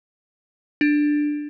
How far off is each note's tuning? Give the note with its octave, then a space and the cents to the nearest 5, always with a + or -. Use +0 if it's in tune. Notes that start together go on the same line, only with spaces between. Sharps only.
D4 +10